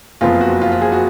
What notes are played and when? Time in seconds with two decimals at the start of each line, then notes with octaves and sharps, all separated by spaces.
0.21 F#1 F2 F3 B3 F4
0.41 F#4
0.62 F4
0.72 F4
0.82 G#4
0.92 F#4